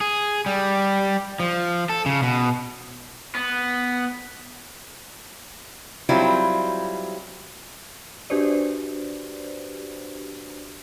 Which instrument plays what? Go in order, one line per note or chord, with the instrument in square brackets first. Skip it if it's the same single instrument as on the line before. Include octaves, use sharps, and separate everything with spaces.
[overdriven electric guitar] G#4
G3
F3
A4
C#3
B2
B3
[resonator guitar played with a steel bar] F#3 G3 C4 E4 F4
[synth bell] D4 F#4 G4 B4 C5 D5